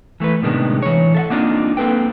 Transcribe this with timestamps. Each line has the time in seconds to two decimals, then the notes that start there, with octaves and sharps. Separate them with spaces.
0.20 E3 A3 E4 B4
0.42 A2 C3 D#3 G#3 B3 D4
0.83 E3 C#5
1.15 A4 E5 F#5
1.30 A#3 C4 D4 D#4 F4
1.77 A#3 C4 A4 B4 G5